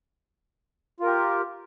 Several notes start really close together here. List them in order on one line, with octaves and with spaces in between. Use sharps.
F4 A#4 G4